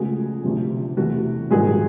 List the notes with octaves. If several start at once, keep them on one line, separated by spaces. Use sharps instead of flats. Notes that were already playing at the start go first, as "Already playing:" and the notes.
Already playing: C#2 C#3 F3 A3 F#4 G#4
D2 C3 F3
E2 C3 E3 A3 F#4
A#1 G#2 D#3 G3 F#4 G#4